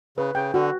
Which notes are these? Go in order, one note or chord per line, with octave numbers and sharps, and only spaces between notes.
C#3 B4
C#3 G5
D3 F#4